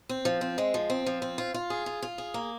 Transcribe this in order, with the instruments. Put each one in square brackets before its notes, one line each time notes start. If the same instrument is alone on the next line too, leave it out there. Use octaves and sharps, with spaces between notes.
[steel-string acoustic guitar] C4
F3
C4
G#3
F3
C4
F3
C4
F4
F4
G#4
F4
F4
G#4
A#3